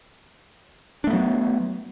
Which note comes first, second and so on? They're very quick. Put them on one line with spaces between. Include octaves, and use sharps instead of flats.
D4 A3 B3 F#3